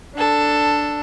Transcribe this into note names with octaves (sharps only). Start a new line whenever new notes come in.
D4 A4